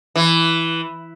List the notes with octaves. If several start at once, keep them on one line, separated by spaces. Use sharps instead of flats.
E3